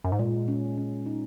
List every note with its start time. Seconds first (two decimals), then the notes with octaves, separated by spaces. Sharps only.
0.04 F#2
0.12 G#2
0.19 A#2 G#3
0.48 C#4
0.78 C#4
1.06 D#4